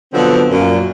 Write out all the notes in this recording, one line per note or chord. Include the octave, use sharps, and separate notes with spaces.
B2 D3 F3 F#3 B3 C4
F#2 A#2